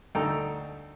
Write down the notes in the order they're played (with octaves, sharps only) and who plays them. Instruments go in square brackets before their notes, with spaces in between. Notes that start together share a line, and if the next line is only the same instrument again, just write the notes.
[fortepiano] D2 D#4 A4 G5 A#5